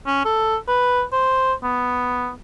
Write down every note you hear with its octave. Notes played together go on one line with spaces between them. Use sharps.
C#4
A4
B4
C5
B3